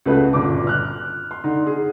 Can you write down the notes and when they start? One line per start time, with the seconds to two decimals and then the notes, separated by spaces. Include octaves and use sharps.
0.06 C#2 C#3 A3 F#4 G#4 B4
0.33 G1 A#2 D6
0.67 F6 F#6
1.31 C6
1.44 D3 D#4
1.67 G#4